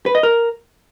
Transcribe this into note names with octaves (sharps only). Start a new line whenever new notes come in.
B4
D#5
A#4